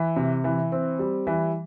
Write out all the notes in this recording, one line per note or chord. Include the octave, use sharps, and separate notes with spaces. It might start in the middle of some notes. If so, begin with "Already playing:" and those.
Already playing: E3
C3
E3
C4
G3
E3